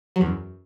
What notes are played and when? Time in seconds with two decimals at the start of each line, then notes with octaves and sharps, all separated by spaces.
0.16 F#3
0.21 E2
0.26 F#2